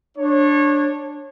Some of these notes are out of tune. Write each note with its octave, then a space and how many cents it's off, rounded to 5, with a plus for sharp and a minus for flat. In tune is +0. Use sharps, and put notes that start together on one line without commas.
D4 +0 C#5 -25